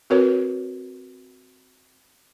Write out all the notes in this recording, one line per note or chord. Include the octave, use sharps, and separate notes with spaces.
C4 F#4 A#4 B4 C#5